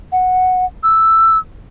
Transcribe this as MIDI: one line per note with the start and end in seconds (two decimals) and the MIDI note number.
0.12 0.65 78
0.83 1.38 88